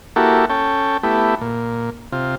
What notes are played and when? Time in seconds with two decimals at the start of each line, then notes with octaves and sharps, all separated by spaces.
0.16 A#3 E4 F#4 G4 A4
0.50 C#4 A4 G5
1.03 A3 B3 E4 G4
1.41 A#2
2.12 C3 F4